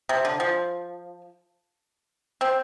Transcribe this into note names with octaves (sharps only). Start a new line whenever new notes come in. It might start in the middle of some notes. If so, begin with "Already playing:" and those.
C3
D3
F3
C4